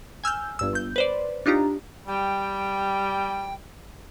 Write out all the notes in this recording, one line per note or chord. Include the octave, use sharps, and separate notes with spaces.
G#5 E6 F6 G6
G1 G2 E6
G1 G6
B4 C5 D5
D4 D#4 F4 G4 A#5
G3 G5